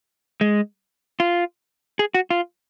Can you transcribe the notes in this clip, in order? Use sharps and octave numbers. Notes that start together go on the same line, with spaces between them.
G#3
F4
G#4
F#4
F4